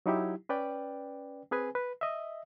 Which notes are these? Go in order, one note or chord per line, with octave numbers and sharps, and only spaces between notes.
F#3 D#4 E4 G4
C#4 B4 D5 G5
C4 G#4 B4 G#5
B4
D#5 E5